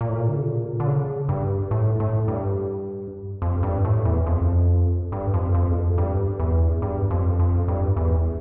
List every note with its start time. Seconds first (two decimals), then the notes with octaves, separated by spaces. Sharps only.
0.01 A#2
0.09 A2
0.16 A#2
0.29 D3
0.36 C#3
0.43 A#2
0.80 D3
0.86 C#3
1.29 G2
1.71 A2
2.00 A2
2.28 G2
3.42 F2
3.63 G2
3.85 A2
4.05 E2
4.26 F2
5.12 G2
5.34 F2
5.54 F2
5.71 E2
5.75 F2
5.98 G2
6.40 E2
6.82 G2
7.10 F2
7.39 F2
7.68 G2
7.96 E2